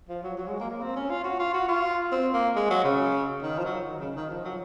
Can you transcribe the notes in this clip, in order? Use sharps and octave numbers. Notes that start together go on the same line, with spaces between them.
F3
F#3
F#3
G#3
A#3
A#3
C4
C#4
F4
F#4
F4
F#4
F4
C4
A#3
G#3
F#3
C#3
D#3
F3
F#3
D#3
C#3
D#3
F3
F#3